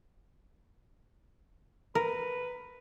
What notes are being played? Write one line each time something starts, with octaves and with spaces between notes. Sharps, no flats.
A#4 B4